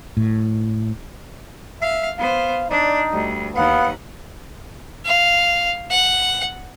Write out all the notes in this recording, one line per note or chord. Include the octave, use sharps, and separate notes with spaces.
A2
E5 F5
B3 C5 F5
D4 D#4 D5
D2 G3
D#2 B3 F5 F#5
F5
F#5